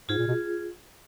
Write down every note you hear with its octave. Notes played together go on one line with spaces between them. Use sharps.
G#2 F4 G#4
A#2
B2